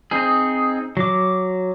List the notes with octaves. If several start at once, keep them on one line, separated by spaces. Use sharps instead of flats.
C4 D#4 G#4
F#3 D6